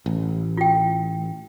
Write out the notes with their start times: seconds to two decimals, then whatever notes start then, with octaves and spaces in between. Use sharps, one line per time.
0.06 A1
0.57 F4 G5